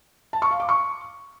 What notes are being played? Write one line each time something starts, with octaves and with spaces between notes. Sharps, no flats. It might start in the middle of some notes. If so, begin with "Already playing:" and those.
A5
C#6
F5
D6
C#6